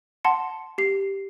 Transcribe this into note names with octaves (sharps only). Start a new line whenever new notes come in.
F#5 A5 C6 C#7
G4 C7